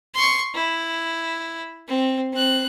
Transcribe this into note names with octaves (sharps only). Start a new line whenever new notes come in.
C6 C#6
E4
C4
C4 F#6